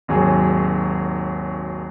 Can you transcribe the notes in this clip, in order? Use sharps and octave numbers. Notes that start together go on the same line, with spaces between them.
G#1 D#2 F#3 G#4 C#5